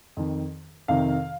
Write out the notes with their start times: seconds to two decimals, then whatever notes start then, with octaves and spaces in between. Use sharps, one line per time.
0.17 F2 D#3
0.88 F2 C3 D#3 F5